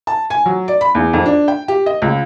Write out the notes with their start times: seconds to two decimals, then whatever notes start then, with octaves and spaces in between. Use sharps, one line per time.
0.07 A5
0.30 G#5
0.46 F#3
0.68 D5
0.81 B5
0.95 E2
1.13 F2
1.26 D4
1.48 G5
1.68 G4
1.86 D#5
2.02 C#2